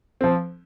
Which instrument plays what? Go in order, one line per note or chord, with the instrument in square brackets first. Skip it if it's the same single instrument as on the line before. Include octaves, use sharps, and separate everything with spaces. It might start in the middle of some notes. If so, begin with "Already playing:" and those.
[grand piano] F3 C4